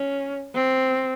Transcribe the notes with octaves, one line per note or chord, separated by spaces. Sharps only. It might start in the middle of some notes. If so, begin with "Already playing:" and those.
Already playing: C#4
C4